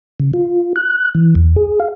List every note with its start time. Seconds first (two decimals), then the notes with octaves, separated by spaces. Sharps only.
0.20 C#3
0.34 F4
0.76 F#6
1.15 E3
1.35 E2
1.56 G#4
1.80 F5